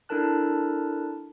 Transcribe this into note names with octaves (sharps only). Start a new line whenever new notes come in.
D4 E4 A4 A#4 A5 F#6